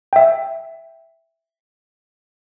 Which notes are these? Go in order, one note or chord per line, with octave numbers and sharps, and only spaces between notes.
E5 G5